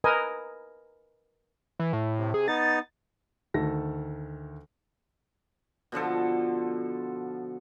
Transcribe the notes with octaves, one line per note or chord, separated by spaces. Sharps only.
A#4 B4 D#5 G#5
E3
A2
C3
G#4
B3 D#4 A6
D2 D#3 A4 A#6
B2 D3 F3 A4